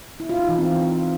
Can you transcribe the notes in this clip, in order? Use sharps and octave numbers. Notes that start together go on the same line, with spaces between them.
E4
F4
D#4
E3
C4